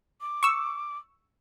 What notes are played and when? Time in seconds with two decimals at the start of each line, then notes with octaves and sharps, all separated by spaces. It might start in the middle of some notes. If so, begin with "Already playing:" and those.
0.21 D6
0.43 C#6 E6